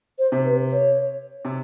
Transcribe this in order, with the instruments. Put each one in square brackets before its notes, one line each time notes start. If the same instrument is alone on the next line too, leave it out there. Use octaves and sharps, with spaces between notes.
[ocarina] C5
[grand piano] C3
[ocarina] B4
C#5
[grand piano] C3